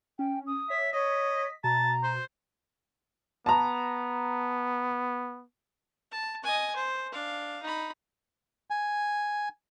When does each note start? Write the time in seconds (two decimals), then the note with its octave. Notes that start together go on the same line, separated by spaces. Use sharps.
0.19 C#4 G5
0.47 D#6
0.70 C#5 E5
0.93 C#5 D#5 B6
1.64 B2 A5 A#5
2.04 C5
3.46 B3 A5 A#5
6.11 A5
6.44 D#5 G#5
6.76 C5
7.12 D4 F5
7.62 D#4 B5
8.70 G#5